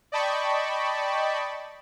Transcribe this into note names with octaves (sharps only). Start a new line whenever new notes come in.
D5 D#5 G5 A5 B5 C#6